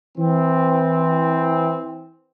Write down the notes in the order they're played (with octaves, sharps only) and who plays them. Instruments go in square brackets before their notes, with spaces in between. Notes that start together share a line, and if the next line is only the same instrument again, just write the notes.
[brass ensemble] E3 C4